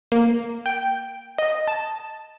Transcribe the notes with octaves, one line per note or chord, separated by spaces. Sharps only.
A#3
G5
D#5
A5